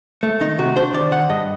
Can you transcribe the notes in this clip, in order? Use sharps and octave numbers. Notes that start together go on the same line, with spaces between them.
A3
D#3 D#4
C3 F#4
D4 C5
D#3 D5
D#3 F#5
G2 D#5